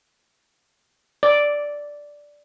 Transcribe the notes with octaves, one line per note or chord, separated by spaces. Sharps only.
D5